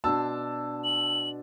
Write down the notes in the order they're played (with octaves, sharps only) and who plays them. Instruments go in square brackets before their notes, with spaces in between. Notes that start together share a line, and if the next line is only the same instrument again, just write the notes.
[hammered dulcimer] B2 D4 C6 [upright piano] A5 E6
[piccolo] F#7